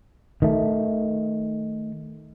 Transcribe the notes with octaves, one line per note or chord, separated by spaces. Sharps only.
D#3 A3